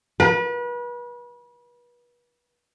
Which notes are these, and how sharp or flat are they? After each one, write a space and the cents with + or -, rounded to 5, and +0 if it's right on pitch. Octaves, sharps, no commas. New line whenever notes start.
B4 -35